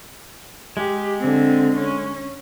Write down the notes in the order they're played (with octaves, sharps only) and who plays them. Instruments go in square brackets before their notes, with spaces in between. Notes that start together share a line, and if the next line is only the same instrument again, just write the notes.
[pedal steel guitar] G#3 [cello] G4
[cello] D3 C4
C#4